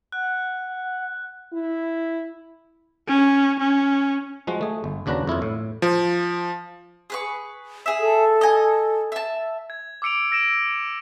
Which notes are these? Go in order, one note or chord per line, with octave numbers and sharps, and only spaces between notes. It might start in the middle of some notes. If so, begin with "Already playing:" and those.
F#5 F#6
E4
C#4
C#4
F3 G#3 F#4
A3 G#4
G1
D#2 C#3 D4 F#4 B4 A#5
F2 E4 F4 C#5
A2
F3
G#4 B4 C#6
G#4 E5
A4
D#5 G#5
E5 A5
G#6
D6 E6 C#7 D7 F7
E6 A#6 D7 E7